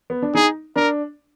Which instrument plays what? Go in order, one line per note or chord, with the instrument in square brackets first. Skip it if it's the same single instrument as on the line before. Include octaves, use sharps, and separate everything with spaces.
[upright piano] B3
D4
[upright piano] D#4 [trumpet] G#4
[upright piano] D4 [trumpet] A#4